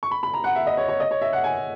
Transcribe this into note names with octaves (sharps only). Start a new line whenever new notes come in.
C#6
B5
B5
A#5
F#5
E5
D#5
C#5
C#5
D#5
C#5
E5
F#5
G#5